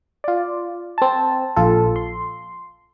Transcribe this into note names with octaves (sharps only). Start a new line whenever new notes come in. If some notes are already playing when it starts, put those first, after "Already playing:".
F4 D5
C4 A5
A#1 F4 A4
C6